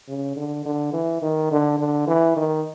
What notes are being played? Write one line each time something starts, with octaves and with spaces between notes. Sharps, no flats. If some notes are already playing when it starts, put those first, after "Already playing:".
C#3
D3
D3
E3
D#3
D3
D3
E3
D#3